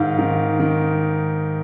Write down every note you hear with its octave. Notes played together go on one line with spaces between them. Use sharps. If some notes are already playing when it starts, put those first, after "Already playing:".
Already playing: G#2 D#3 F5
D#3
D#3